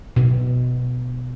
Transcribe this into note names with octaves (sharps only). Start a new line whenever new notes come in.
B2